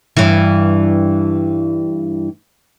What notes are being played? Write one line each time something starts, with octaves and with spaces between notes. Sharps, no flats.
G2 E3